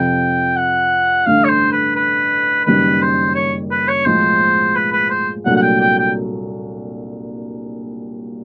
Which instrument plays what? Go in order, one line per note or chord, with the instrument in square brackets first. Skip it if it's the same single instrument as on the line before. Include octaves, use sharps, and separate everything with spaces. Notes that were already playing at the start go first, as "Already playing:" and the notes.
Already playing: [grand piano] F2 C3 F3 [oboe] G5
[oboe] F#5
[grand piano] A1 G2 D3 [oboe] F5
[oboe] C#5
C5
B4
B4
[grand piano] F#1 F#2 D#3 G3 [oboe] B4
[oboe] C5
C#5
B4
C#5
[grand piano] B1 A2 F3 G#3 [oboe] C5
[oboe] B4
B4
C5
[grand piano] C2 A#2 F#3 A3 D4 [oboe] F#5
[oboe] F#5
G5
G5
G5